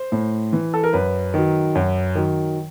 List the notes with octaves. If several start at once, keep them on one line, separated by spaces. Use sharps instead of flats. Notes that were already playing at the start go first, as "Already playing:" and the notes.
Already playing: C5
A2
E3
A4
A#4
F#2 B4
D#3 F#3
F#2
D#3 F#3